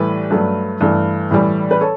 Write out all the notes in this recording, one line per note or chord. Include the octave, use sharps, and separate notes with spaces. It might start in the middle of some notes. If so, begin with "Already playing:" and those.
Already playing: A2 E3 G3 B4
G2 F#3 A3
G2 E3 A3
A2 E3 G3
B4
A4 C#5